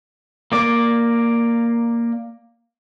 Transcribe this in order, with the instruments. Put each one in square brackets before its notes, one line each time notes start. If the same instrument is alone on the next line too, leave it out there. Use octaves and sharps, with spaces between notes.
[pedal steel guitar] A#3 D5